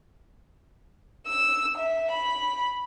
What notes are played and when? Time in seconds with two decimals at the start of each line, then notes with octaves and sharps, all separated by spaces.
1.27 E6
1.76 E5
2.11 B5